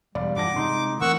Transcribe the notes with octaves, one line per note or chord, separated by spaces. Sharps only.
E1 G3 D5 F5
G2 E3 F3 F#5 A5 D6 A#6
C3 G#3 D#4 C6
E3 A3 C4 A#4 F#5 C#6 E6